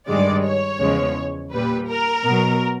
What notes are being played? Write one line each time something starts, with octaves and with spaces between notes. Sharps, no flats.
G2 D#3 G#3 D5
C#5
E2 C#3 F3 G#3
A#2 G3 B4
A#4
B2 F#3